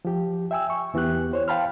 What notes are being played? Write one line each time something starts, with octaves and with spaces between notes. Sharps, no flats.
F3 G4
E5 G5 G#5 E6
C#6
E2 E3 B3 G4 F#6
C5 C#5
F5 G5 A5 B5 C6 F6